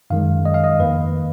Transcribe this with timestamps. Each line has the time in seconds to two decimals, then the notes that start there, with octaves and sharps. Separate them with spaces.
0.10 F#2 D#3 G#3 F5
0.45 D#5
0.54 F5
0.64 D#5
0.79 F2 D#3 A#3 B4